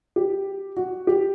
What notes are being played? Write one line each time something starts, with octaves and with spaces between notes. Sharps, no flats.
G4
F#4
G4